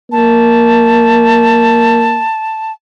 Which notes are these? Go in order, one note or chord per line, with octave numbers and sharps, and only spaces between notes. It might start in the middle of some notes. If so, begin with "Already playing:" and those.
A#3 A5